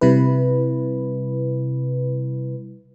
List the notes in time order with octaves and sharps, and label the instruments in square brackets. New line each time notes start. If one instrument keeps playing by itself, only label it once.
[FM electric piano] C3 G3 E4 B4